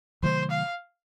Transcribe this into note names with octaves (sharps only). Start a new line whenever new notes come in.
C3 D#3 F#3 A3 C5
F5